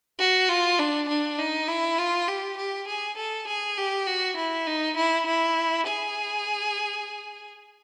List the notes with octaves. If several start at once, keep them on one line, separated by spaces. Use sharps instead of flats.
F#4
F4
D4
D4
D#4
E4
F4
G4
G4
G#4
A4
G#4
G4
F#4
E4
D#4
E4
E4
G#4